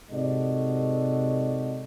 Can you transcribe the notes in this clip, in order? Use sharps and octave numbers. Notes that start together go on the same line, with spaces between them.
G#2 C3 F#4 A4 D5 D#5